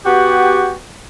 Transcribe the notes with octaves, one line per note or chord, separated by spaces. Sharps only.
B3 F#4 G4